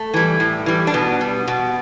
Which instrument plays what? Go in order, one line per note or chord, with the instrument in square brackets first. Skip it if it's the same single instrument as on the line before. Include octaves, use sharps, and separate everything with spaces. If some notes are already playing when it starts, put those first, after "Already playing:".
Already playing: [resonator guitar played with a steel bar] A3
E3 G3
A2
E3 G3
D4
B2 B3
G3
B2